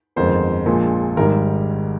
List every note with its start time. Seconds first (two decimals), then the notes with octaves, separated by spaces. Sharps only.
0.16 G1 F2 D#3 G#3 C5
0.66 A#1 A#2 F3 G#3
1.17 G#1 G#2 G3 A#4